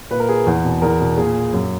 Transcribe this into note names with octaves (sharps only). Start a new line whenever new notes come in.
A#2 B4
A#4
G#4
E2
B2
E2 A#4
B2
A#2 G#4
F#2